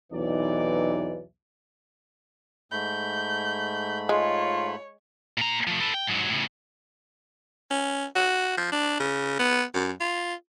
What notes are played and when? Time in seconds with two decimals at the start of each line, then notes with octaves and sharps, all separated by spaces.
0.12 B1 E2 C3 E3 D#4 D5
2.72 G#2 A3 B5 G6
4.09 G#3 F4 C#5
5.38 A#2 A#5
5.67 F3 A3
5.80 A4 B4
5.94 G5
6.07 G#2 F#3
6.29 A2 C#3
7.71 C#4
8.16 F#4
8.57 F3
8.72 D4
9.00 C#3
9.39 B3
9.74 F#2
10.00 F4